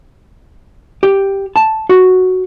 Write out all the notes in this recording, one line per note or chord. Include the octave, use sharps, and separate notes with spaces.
G4
A5
F#4